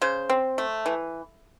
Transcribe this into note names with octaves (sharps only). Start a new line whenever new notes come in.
C#3 C5
C4
A3
E3